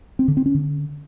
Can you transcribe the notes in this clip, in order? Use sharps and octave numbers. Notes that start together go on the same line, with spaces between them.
C4
D3
C4
C#4
D3